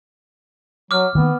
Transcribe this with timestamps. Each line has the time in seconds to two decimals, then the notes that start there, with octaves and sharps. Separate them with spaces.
0.91 F#3 D6 F6
1.15 D#3 A#3 B3